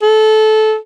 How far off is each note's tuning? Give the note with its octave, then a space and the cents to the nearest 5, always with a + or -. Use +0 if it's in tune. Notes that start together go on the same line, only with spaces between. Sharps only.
A4 -20